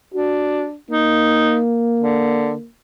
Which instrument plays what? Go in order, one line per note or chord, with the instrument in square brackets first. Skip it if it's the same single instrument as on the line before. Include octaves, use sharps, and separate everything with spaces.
[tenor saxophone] D4 [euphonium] F#4
[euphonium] A#3 [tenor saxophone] D#4
[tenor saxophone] D3